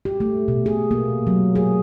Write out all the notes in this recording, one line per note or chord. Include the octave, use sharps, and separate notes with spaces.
G4
A3
B2
G#4
A#3
F#3
G#4